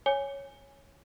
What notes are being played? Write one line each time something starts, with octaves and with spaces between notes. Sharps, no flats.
C#5 G#5